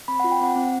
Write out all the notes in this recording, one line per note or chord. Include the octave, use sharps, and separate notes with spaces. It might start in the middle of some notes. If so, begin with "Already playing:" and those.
C4 B5
F#5
F4
G5
C4 F#5
C4